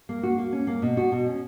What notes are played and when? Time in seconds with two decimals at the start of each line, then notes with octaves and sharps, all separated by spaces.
0.09 A#3
0.23 F#4
0.38 A#3
0.52 C#4
0.67 A#3
0.82 B2
0.97 F#4
1.12 B2
1.26 C#4